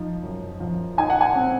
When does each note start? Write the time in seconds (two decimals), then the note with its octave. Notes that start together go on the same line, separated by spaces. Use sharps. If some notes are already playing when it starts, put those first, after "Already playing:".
Already playing: F3 D#4
0.23 F#2
0.60 F3
0.98 D#4 G#5
1.10 F#5
1.21 G#5
1.36 C4